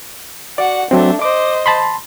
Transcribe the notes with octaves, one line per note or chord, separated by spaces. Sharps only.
F#4 D5 F#5
F#3 A3 C4 D4
C5 D#5 D6
A5 B5 C6